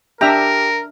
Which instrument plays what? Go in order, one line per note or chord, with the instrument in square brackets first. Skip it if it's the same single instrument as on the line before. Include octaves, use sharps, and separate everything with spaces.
[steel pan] D4 E5 A#5 [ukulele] G4 [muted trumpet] A#4